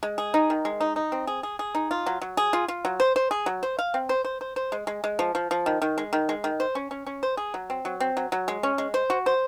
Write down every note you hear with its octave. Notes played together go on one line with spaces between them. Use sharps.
G#3
G#4
D#4
D#3
G#3
D#4
D#4
C4
G#4
G#4
G#4
D#4
F4
F#3
F#3
G#4
F4
F4
F#3
C5
C5
G#4
F#3
C5
F5
C4
C5
C5
C5
C5
G#3
G#3
G#3
F3
F3
F3
D#3
D#3
G#3
D#3
G#3
D#3
C5
C#4
C#4
C#4
C5
G#4
F#3
C4
F#3
C4
F#3
F#3
G#3
C#4
G#3
C5
F#4
C5